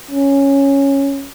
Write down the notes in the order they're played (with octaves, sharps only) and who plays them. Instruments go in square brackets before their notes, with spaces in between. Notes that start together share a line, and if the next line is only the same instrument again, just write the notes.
[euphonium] C#4